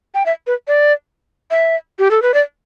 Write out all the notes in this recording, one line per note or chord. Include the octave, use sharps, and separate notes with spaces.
G5
E5
B4
D5
E5
G4
A4
B4
D5